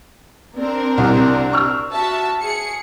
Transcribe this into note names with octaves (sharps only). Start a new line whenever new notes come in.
C4 D4 A#4
C2
C#6 E6 F6
F#4 E5 A5
G#4 C#7